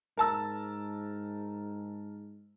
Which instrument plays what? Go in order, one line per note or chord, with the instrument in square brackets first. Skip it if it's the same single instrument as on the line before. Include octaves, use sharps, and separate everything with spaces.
[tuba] G#2 [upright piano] A#4 A5 E6